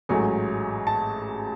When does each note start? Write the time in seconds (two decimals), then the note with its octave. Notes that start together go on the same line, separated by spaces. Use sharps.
0.09 A1 G#2 F#3 A3 G#5
0.87 A5